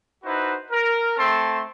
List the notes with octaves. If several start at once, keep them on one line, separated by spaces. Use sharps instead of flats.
D#4 E4 F#4 B4 C5
A#4
A3 C4 A4 A5 C6